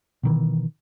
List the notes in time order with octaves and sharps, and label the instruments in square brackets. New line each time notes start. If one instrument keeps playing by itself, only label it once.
[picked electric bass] B2 D#3 E3